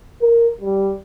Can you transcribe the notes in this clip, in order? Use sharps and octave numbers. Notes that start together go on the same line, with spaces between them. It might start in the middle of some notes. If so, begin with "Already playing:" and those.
A#4
G3